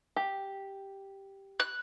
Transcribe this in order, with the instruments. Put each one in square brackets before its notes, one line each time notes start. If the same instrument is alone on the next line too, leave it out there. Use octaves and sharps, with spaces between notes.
[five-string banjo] G4
[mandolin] F#6